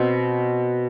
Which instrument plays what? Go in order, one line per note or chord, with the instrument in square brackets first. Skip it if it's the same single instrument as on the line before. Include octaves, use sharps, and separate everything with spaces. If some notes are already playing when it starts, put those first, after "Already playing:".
Already playing: [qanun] B2 C4